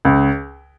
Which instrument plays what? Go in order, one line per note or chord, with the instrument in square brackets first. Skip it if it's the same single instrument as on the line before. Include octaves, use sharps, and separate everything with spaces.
[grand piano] C#2